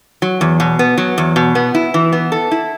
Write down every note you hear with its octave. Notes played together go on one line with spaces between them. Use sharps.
F#3
E2
B2
B3
F#3
E2
B2
B3
E4
E3
B3
A4
E4